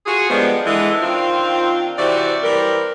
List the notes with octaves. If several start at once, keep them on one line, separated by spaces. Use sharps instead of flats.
F4 F#4 G#4
D3 F3 G3 G#3 B3
D3 E3 G#3
D#3 C4 D4 F4
C3 E3 F#4 C5 D5
E3 G3 C4 A#4